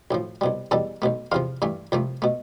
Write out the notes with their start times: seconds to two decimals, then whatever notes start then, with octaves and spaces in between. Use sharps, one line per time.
0.11 B1 A2 F3
0.41 C2 B2 G3
0.71 E2 B2 G3 A4 A5
1.02 B1 B2 A3
1.32 E2 C3 F3 F4 F5
1.62 G2 E3 A3
1.92 C2 C3 F3 A3
2.22 B2 A3